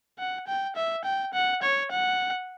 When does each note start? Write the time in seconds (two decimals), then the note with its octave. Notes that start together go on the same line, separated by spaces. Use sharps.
0.19 F#5
0.47 G5
0.76 E5
1.05 G5
1.34 F#5
1.63 C#5
1.91 F#5